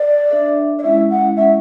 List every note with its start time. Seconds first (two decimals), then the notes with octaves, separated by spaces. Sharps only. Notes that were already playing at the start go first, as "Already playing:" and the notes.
Already playing: D5
0.30 D4 A4 E5
0.79 D5
0.83 G#3 C#4 E4 E5
1.10 F#5
1.37 G#3 C#4 E4 E5